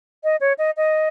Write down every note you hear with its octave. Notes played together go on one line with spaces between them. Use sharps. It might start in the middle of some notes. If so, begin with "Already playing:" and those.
D#5
C#5
D#5
D#5